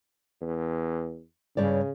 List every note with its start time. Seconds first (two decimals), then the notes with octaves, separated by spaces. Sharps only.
0.41 E2
1.57 G2 C#3 C#5 D5